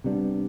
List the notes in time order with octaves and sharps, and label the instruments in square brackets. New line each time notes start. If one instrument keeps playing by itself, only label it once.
[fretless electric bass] C3 G3 B3 D4